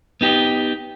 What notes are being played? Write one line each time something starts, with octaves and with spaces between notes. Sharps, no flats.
B3 D#4 G4